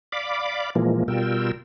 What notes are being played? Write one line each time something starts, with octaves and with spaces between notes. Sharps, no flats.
D5 F5 B5 D6
A#2 E3 F3 G#3 A#3
B2 G3 F4 A#4 G5 E6